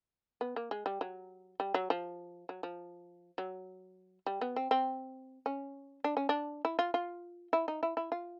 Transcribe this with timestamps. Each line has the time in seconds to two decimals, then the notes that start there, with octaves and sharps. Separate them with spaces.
0.41 B3
0.56 A#3
0.71 G#3
0.86 G3
1.01 F#3
1.60 G3
1.74 F#3
1.90 F3
2.49 F#3
2.63 F3
3.38 F#3
4.26 G3
4.41 B3
4.56 C4
4.71 C4
5.46 C#4
6.04 D4
6.17 C#4
6.29 D4
6.65 E4
6.79 F4
6.94 F4
7.53 E4
7.68 D#4
7.83 E4
7.97 E4
8.12 F4